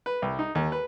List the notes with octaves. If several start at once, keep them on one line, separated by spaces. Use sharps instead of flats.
B4
C2
D#4
D#2
B4